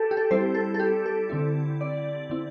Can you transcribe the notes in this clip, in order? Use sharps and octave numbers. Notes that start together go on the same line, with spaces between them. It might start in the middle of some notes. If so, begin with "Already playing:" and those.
Already playing: G4 A4
G4
A4
G3 C4 E4 C5
A4
A4
G4
A4
D3 C4 E4
D5
D3 C4 E4